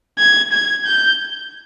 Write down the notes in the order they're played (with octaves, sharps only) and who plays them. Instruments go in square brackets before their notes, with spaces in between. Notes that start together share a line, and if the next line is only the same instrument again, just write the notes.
[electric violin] G#6
G#6
G6